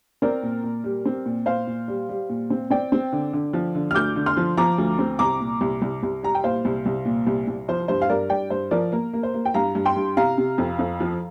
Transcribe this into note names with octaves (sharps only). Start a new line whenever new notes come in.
C4 A#4 D5
A#2
A#2
G3
C4
A#2
A#2 C5 F5
A#2
G3
G3
A#2
C4
C4 D5 G5
C4
D3
D3
F3
D3
F6
D2 D6 G6
D3
C6 F6
F3
F3 A#5 D6
D2
C4
C2 A#5 D6
A#2
C2
C2
C2
G3 A#5
G5
A#2 C5 F5
C2
C2
A#2
C2
C2
F3 C5
G2 C5
F5
G2 A#4 D5
G2 D5 G5
G2 C5
F3 A#4 D5
A#3 A#4
A#3
C5
A#3
G5
G2 F5 A#5
G2
G5 C6
G2
C3 F5 A#5
C3
F2
F2
F3